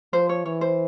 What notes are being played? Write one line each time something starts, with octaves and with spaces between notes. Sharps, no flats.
F3 C5
C#5
E3 C#5
C5